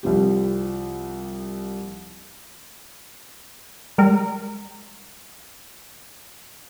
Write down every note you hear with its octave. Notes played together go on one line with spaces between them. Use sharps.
C2 F3 G4
G3 G#3 A#4